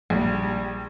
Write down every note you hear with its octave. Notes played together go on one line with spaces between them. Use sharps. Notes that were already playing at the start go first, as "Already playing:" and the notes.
A#1 G3